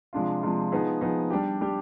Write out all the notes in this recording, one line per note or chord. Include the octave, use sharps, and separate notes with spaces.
C3 F3 G#3 D4 F4
C3 F3 G#3 D4 F4
F3 B3 D#4 G#4
F3 B3 D#4 G#4
G3 D4 G4
G3 D4 G4